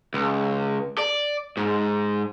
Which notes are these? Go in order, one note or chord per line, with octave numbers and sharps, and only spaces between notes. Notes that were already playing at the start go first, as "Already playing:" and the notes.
C#2
D5
G#2